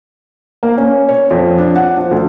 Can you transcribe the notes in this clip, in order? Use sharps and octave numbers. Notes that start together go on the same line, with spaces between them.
A#3
C#4
C#5
F2
D4
F#5
F3
D2